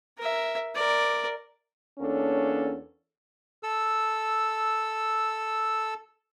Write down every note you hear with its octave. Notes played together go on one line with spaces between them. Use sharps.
A#4 E5
A#4 D5
E2 A#3 C#4 D4 A4 C#5
A4 E6